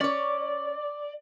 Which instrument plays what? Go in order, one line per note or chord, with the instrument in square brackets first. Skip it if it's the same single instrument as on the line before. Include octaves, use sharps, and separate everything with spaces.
[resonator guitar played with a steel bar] C#4 C#5 [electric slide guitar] D5 [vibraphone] D6